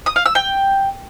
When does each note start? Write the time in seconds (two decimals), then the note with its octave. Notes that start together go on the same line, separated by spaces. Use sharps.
0.06 D#6
0.16 F5
0.26 E6
0.35 G5